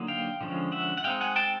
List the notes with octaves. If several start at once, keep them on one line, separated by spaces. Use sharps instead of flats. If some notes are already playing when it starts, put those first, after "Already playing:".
Already playing: D3 F#3 A#3 D#4
F5 G5
D3 F3 G#3 C#4
E5 F#5
F#5
G#3 C4 D#4 F5 G5
F#5 G#5
G5 A5